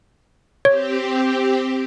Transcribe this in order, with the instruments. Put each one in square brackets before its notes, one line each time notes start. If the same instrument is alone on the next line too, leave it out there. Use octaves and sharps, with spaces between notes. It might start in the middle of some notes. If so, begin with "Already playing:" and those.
[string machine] C4 G4 [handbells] C#5